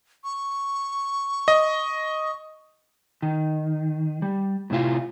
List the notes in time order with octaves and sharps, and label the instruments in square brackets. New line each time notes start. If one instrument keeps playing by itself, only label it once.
[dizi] C#6
[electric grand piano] D#5
[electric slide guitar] D#3
G3
A2 C3 E4 F4